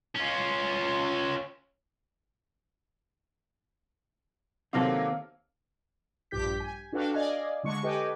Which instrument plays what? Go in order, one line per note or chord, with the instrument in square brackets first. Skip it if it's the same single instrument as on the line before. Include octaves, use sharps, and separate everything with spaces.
[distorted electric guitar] C#4 F4
[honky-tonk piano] C3 F#3 A#3 [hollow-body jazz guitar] D#3 C4 A4 [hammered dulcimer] F5
[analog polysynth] A#1 G2 G4 G6 B6
G#5
D4 F#4 A4 B4 F5 G5
D5 D#5 F5 G#5
D3 G#3 C#6 C#7
G4 A4 B4 D#5 G5 G#5